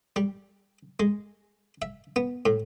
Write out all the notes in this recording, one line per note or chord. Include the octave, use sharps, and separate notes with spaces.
G3
G#3
E5
B3
A2